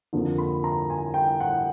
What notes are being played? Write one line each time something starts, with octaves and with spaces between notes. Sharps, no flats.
F2 D3 F3 A#3
B5
A#5
G#5
G5
F#5